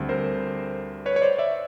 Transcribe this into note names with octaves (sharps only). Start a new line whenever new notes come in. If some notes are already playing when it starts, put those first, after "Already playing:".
Already playing: D2 D3 G3 C4
A#4 C5
B4 C#5
C#5
C5 D5
D5 E5